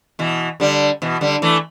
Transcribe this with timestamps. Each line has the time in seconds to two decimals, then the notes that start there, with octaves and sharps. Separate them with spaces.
0.19 B2 E3
0.60 D3 G3
1.02 B2 E3
1.21 D3 G3
1.42 E3 A3